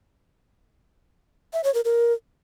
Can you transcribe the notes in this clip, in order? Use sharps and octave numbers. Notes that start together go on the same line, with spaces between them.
E5
C#5
A#4
A#4